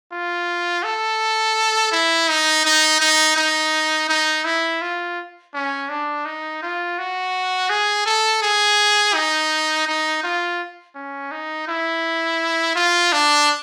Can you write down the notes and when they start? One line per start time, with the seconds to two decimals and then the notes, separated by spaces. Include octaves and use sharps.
0.12 F4
0.83 A4
1.92 E4
2.29 D#4
2.65 D#4
3.01 D#4
3.36 D#4
4.09 D#4
4.45 E4
4.82 F4
5.54 C#4
5.89 D4
6.25 D#4
6.63 F4
6.99 F#4
7.70 G#4
8.06 A4
8.43 G#4
9.14 D#4
9.88 D#4
10.24 F4
10.96 C#4
11.32 D#4
11.68 E4
12.76 F4
13.13 D4